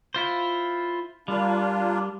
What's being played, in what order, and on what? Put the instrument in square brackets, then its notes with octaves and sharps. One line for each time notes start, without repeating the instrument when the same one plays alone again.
[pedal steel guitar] E4 F4 C5
[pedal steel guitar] G3 [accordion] A#3 D4 F4